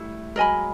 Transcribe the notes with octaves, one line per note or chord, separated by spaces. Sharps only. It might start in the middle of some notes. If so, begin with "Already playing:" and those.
Already playing: G3 A3 E4
F#3 G#3 A#4 D#5 G#5 B5